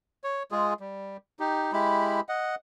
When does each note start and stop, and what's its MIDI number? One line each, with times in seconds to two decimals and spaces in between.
0.24 0.43 73
0.52 0.74 56
0.52 0.74 65
0.52 0.74 68
0.80 1.17 55
1.40 1.73 63
1.40 1.73 67
1.73 2.21 56
1.73 2.21 64
1.73 2.21 67
1.73 2.21 83
2.29 2.55 75
2.29 2.55 78